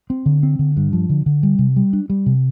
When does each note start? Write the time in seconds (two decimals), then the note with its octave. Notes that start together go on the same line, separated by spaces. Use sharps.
0.10 C4
0.26 D3
0.43 C4
0.59 D3
0.77 G2
0.93 F3
1.10 D3
1.26 D3
1.43 G3
1.59 C3
1.76 G3
1.93 D4
2.10 G3
2.26 C3